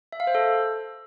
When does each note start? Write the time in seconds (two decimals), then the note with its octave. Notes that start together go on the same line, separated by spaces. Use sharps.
0.12 E5
0.20 F5
0.27 C5
0.35 A4